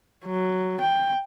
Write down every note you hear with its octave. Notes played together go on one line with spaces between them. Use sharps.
F#3
G5